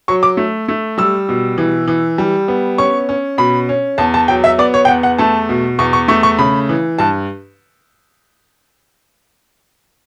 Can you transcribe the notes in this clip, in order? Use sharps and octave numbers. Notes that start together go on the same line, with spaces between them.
F#3 C#6
D6
A3
A3
G3 E6
B2
E3
E3
G3
B3
C#4 C#6
C#4
B2 B5
C#4
E2 A5
A5
F#3 G5
E5
B3 D5
C#5
G5
E2 F#5
F#5
A3 A5
B2
E2 C#6
C#6
A3 C#6
C#6
C#3 B5
E3
G2 A5